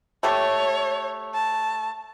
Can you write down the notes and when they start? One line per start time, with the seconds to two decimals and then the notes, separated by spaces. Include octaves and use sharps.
0.23 A3 G4 A4 C#5
1.34 A5